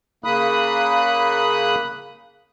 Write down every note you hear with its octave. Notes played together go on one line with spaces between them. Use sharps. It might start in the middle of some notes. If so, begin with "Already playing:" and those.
C#3 A#3 B5 D#6 F#6